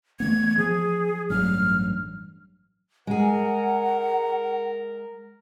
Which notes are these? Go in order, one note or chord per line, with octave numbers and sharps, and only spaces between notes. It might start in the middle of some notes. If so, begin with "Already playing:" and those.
E3 A3 B3 G#6
F3 G#4
A1 G2 F#3 F6
G#3 G#4 A#4 F#5